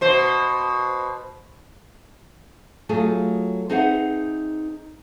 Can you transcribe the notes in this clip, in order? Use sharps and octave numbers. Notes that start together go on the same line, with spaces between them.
B2 C5
F#3 A3 F4 G#4
C4 D#4 G#4 B4 E5 F#5